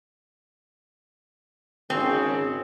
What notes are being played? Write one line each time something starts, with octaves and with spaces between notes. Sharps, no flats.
G#1 C#3 C4